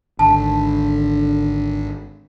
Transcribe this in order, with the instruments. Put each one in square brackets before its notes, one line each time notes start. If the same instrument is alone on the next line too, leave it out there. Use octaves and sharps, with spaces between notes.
[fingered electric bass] G#1 [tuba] D3 [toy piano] A5